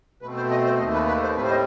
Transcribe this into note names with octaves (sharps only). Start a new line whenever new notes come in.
B2 A3 C4 B4
C5
D#5
C5
D#2 D#3 A3 D#5
B4
B4
C5
A2 G3 C4 B4
C5
D#5